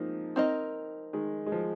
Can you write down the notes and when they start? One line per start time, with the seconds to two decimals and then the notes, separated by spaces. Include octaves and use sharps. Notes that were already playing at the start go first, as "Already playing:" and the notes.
Already playing: F3 G#3 A#3 C4 D#4
0.36 C4 D#4 A#4 D#5
1.13 D#3 G#3
1.46 G#3
1.52 F3